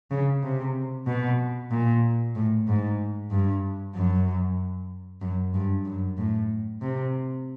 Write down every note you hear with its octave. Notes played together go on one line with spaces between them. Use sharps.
C#3
C3
B2
A#2
A2
G#2
G2
F#2
F#2
G2
F#2
A2
C3